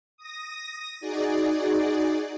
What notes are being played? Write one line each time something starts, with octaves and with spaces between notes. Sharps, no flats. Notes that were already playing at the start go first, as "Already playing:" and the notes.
D#6 A#6
D#4 F#4 G#4 D5